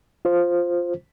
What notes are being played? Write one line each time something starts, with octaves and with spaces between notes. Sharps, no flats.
F4 C5